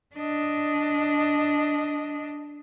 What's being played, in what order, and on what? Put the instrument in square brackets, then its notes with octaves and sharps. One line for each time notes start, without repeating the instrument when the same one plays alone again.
[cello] D4 D#5